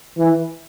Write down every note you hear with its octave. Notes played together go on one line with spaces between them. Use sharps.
E3